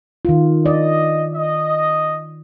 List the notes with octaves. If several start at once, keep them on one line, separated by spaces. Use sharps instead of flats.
D#3 F4
D5 D#5
D#5